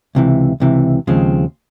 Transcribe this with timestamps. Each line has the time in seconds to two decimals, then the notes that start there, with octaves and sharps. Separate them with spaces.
0.15 C#2 C3 E3
0.60 C#2 C3 E3
1.07 D#2 C#3 F3 G#3 C4